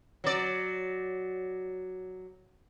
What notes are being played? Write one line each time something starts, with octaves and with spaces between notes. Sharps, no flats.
F#3 D5